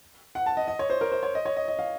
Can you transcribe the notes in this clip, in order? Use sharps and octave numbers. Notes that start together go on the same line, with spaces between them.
F#5
A5
D#5
D#5
C#5
C5
A#4
C5
C#5
D#5
C#5
D#5
D#5
F5